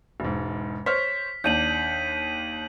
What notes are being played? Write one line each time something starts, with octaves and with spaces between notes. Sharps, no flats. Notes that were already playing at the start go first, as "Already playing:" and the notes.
E1 G#2
C5 C#5 F6 B6
D#2 D4 G6 D#7 F#7